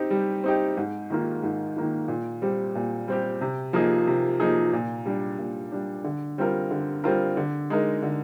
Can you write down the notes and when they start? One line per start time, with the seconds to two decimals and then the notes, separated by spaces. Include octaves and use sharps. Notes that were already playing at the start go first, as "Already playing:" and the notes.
Already playing: C4 D#4 G4
0.10 G3
0.44 C4 D#4 G4
0.77 G#2
1.10 D#3 A#3 F4
1.43 G#2
1.76 D#3 A#3 F4
2.08 A#2
2.42 G3 C4 G4
2.75 A#2
3.08 G3 C4 G4
3.41 C3
3.73 F3 A#3 D#4 G#4
4.07 C3
4.40 F3 A#3 D#4 G#4
4.73 A#2
5.06 G3 D4
5.39 A#2
5.72 G3 D4
6.04 D3
6.38 G3 C4 F4 A#4
6.71 D3
7.04 G3 C4 F4 A#4
7.37 D3
7.70 G#3 D#4 A#4
8.02 D3